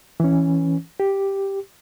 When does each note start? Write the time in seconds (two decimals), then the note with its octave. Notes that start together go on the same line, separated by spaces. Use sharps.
0.20 E3 C#4
1.00 G4